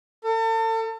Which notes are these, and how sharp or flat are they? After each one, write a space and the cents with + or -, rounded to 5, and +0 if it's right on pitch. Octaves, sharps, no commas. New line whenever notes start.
A4 +40